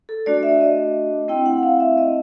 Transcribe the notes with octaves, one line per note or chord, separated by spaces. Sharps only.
A4
A3 D4 F#4 D5
E5
D#5
A3 C4 E4 G5
F#5
F5
E5
D#5